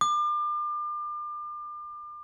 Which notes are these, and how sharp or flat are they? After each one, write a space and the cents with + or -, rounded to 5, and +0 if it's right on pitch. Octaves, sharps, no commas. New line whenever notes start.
D6 +35